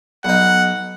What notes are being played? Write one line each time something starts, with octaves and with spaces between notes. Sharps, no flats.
B1 D#4 F#5